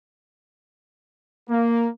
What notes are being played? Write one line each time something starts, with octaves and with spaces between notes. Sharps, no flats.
A#3